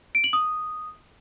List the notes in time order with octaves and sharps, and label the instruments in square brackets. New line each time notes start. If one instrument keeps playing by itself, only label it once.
[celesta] D7
F#7
D#6